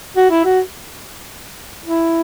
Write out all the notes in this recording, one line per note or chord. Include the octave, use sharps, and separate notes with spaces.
F#4
E4
F#4
E4